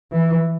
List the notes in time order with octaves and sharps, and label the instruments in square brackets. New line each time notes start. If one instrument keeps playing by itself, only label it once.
[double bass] E3